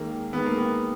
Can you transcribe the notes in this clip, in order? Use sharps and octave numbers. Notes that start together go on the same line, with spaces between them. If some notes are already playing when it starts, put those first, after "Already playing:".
Already playing: D#2 D#3 G#3 A#3
D#2 D#3 G#3 B3
A#3
B3